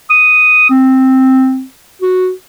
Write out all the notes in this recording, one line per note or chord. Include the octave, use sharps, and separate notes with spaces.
D#6
C4
F#4